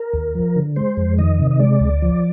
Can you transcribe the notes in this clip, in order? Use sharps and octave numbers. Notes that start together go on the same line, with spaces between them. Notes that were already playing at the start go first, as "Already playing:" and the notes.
Already playing: A#4
D#2
F3
D3
G#3 C5
F2
D#3 D#5
C3
D#5
G#3 D5
D2
F3